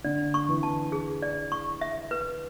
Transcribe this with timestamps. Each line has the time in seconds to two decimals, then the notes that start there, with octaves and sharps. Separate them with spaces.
0.04 D3 D5
0.34 C#6
0.49 E3
0.63 A5
0.92 G#4
1.22 D5
1.52 C#6
1.81 E5
2.11 B4